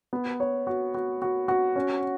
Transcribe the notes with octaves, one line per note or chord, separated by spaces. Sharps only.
B3
C#5
F#4
F#4
F#4
F#4
C#4